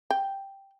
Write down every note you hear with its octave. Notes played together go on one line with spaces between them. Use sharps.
G5